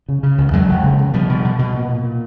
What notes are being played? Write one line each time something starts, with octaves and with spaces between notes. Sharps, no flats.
C#3
C#3
C#2
E2 F#3 G#3
E1
C#3
C#3
B2 F3 G3
B2
B2
B2
A#2
A#2
A#2